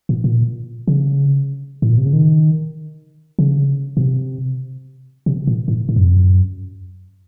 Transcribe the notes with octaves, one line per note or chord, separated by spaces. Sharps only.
A#2
A#2
C#3
A2
A#2
C3
C#3
D#3
C#3
A#2
C3
C3
A#2
A2
A2
F#2
F2
F#2